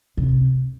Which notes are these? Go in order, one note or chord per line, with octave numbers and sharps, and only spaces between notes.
C3